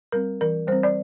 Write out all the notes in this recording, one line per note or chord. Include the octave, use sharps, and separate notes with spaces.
G3 C4 A#4
E3 A#4
G3 C4 C5
D5